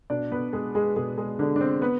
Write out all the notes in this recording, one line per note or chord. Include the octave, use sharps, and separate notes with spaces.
B2 D4 D5
B3 B4
G#3 G#4
G#3 G#4
B2 G#3 G#4
G#3 G#4
D3 G#3 D4
D4
C4
B3 B4